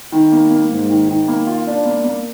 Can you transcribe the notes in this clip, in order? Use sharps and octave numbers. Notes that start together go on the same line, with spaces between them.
D#3
A#3
A#3
G#2
D#3
D#3
A#3
F4
D4
A#3
A#3